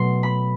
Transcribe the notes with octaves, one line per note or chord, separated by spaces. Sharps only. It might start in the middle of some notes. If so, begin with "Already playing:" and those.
Already playing: B2 F#3 A3 C6
B5